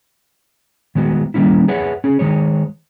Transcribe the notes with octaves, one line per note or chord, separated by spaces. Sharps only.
D#3 G#3 B3 F#4
D#3 G3 A#3 C#4 E4
G#4 B4 C#5 E5 F#5
C#4 G#4
D#3 G#3 G#4 C#5